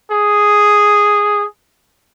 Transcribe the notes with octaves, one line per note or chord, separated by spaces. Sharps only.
G#4